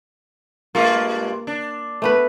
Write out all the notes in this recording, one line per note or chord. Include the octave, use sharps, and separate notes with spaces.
G2 G#3 A#3 F4
D4
A3 B3 B4